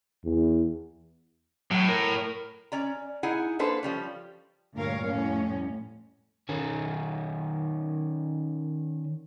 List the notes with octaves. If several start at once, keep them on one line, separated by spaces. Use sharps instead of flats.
E2
A2 F#3
A#4
C#4 D5 A#5
D#4 E4 G#4 F#5 G#5
A#3 D4 A4 B4 C5
F3 G3 C#4
D2 G2 A#2 A#4 C#5 F5
F2 A2 G3 C#4
D#3 C#4